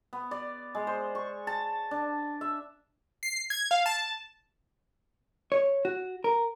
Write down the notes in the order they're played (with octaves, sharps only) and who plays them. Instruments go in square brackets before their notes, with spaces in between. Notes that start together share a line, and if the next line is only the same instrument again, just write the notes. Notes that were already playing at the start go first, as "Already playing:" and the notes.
[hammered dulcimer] B3
D5
G#3
C5
C#6
A5
D4
E5
[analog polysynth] C7
G#6
F5
A5
[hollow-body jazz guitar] C#5
F#4
A#4